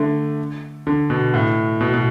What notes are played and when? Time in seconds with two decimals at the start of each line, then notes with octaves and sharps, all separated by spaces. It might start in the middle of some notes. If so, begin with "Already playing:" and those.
Already playing: D3 A3
0.87 D3
1.10 B2
1.34 A2
1.81 B2
1.94 B2